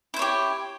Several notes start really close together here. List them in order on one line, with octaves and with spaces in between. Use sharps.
E4 C5 C#5 G4